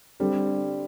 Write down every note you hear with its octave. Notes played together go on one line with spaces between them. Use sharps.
D3 G3 C4